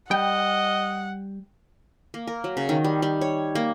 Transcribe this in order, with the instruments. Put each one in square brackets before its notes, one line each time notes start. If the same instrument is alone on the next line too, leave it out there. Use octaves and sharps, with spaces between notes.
[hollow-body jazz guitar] G3 [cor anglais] D#5 [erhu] F#5 [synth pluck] G5
[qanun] A#3
A#4
F#3
C#3
D#3
G3
G3
C#5
A#3